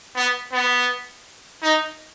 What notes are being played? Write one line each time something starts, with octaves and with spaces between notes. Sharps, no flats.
B3
B3
D#4